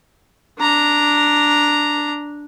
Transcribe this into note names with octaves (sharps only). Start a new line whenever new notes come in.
D4 A#5